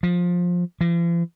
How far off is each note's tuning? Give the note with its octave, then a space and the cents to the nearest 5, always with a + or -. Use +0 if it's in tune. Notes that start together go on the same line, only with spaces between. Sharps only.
F3 +15
F3 -45